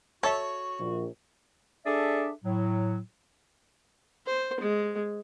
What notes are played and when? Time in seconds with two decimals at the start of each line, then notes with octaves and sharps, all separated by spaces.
0.23 F#4 A4 C#5 E5
0.79 A#1
1.85 D4 G#4 A4 D5 E5
2.44 A2 F#3
4.26 C5
4.60 G#3